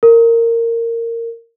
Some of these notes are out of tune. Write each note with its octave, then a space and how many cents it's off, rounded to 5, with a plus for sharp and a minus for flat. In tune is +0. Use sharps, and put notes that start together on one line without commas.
A#4 -15